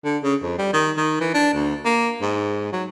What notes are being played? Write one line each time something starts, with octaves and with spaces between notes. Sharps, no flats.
D3
C#3
F2
G3
D#3
D#3
E3
D4
D2
A#3
G#2
F#3